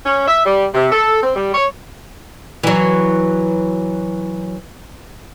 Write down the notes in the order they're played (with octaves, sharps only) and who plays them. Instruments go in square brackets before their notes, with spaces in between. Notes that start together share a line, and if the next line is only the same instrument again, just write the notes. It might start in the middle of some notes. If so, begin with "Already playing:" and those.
[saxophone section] C#4
E5
G3
C3
A4
C4
G3
C#5
[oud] E3 F#3